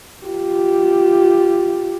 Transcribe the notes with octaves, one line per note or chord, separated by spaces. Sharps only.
F4 G4